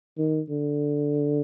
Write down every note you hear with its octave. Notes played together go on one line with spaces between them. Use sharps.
D#3
D3